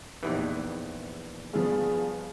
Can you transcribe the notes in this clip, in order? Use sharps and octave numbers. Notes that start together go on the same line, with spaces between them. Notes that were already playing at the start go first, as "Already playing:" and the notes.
A#1 E2 E3 D#4 G4 B4
A#3
G2 F3 B3 G#4